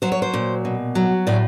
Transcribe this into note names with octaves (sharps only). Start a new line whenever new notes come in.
F#3 C5
C#5
C5
A#2
B2
F#3
A2 D5